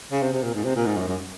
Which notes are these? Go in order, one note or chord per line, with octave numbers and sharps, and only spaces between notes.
C#3
C3
C3
A#2
G#2
C3
A#2
G#2
F#2
F#2